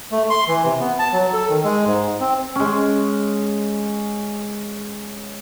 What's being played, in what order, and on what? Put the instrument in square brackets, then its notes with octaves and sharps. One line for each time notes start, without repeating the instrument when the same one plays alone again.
[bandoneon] A3
C6
E3
C3
B3
A5
F#3
A4
D#3
G#3
G#2
C4
[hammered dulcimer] G#3 C#4